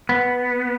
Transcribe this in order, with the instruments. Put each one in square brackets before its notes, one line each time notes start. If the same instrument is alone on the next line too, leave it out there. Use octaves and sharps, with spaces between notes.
[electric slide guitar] B3